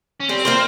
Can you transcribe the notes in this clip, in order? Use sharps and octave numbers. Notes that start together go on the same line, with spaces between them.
C#4
G3 C4
A#3 F4 C5